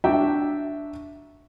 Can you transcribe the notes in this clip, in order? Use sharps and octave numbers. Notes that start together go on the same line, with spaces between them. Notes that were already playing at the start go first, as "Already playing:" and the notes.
D4 F#4 E5 G5 A#5